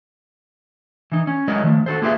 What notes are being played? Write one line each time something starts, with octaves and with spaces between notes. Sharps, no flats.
E3 D#4
C#4
F#3 G#3 E4 A#4 C#5 D#5
D#3 F3 A3
F#4 A4 C5
A#3 F4 G4 G#4 B4 E5